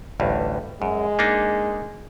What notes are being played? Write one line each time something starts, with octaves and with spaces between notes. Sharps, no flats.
A1 D2 G2
F#2 G#3
A#3 D4 D#4